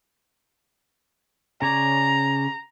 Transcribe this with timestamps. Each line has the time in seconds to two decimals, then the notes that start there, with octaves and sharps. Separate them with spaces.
1.62 C#3 C#5 D5 A#5